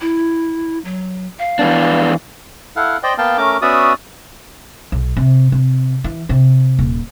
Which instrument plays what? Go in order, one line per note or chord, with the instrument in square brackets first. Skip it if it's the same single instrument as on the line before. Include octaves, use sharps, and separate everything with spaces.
[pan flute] E4
F#3
F5
[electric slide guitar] E3 B3 D4
[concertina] E4 A4 F5 F#5
C5 D5 D#5 G5
A#3 B3 F5 G5 A5
A3 C#4 A#4 D6
B3 C#4 F#4 D5 E5 D#6
[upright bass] B1
C3
C3
E3
C3
D#1